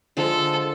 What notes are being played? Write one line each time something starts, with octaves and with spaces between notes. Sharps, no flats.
D3 F3 G#3 A4